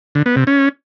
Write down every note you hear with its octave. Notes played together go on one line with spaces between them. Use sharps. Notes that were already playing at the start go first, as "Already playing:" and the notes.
D3
B3
C3
C#4